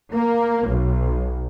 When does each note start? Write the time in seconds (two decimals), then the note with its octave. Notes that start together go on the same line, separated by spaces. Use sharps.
0.13 A#3
0.68 B1